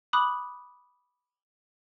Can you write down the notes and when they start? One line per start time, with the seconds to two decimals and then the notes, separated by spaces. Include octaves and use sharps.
0.13 B5 D6 D#6 F#6 F#7